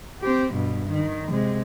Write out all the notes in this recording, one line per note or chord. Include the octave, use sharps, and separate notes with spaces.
C4 G4
G2 B2
D#3
C3 G#3